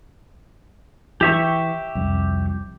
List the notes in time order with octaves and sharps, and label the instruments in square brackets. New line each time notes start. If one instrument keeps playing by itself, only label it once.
[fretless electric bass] E3 [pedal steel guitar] G4 E5 C#6
[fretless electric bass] C2 F2